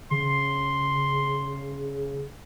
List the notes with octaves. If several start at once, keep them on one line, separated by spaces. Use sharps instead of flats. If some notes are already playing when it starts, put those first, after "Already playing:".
C#3 C6